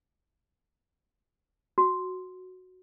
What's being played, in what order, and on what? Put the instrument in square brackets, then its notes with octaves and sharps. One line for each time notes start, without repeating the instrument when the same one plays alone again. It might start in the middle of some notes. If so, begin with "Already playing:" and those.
[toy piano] F#4